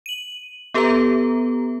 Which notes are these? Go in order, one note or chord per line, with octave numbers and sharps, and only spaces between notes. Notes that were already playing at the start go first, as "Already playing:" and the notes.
D#7 F#7
B3 G4 A4 B4 E5 A#5